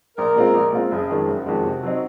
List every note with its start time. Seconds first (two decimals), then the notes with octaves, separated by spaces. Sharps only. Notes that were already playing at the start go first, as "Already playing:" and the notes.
0.17 A#1 A#4
0.36 A#2 G#3 C4 F4
0.54 A#1
0.73 A#2 G#3 C4 F4
0.91 F#1 G#4
1.09 F2 D#3 G#3
1.28 F#1 F#4
1.46 F2 D#3 G#3
1.64 C3
1.83 F#3 C4 D#4